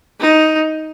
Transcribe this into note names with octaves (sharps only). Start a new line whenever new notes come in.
D#4